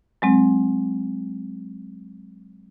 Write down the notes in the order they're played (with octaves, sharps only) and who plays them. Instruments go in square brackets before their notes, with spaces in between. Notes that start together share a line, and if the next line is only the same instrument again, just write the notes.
[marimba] F#3 G#3 C4